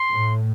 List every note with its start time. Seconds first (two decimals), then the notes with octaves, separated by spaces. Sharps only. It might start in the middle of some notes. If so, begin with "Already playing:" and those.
Already playing: C6
0.12 A2